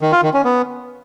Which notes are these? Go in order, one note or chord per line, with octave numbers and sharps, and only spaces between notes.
D#3
F4
D#3
C#4
B3